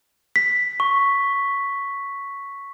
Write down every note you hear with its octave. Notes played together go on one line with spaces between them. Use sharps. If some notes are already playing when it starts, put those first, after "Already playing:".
B6
C#6